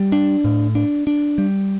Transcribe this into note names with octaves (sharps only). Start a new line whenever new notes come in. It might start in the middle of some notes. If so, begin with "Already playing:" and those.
Already playing: G3
D4
A2
D4
D4
G3